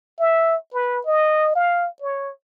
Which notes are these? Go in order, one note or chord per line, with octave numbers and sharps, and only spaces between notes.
E5
B4
D#5
F5
C#5